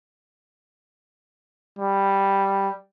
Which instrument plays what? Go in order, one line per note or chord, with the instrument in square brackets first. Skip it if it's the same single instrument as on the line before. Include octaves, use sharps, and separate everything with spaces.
[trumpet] G3